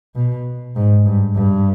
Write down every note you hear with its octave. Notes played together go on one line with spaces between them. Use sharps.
B2
G#2
G2
G2